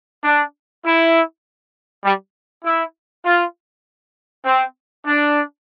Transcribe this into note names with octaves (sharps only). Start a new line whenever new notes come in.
D4
E4
G3
E4
F4
C4
D4